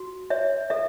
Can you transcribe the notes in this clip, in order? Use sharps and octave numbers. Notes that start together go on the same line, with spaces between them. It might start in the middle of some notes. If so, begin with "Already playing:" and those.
Already playing: F#4
C#5 E5
A4 E5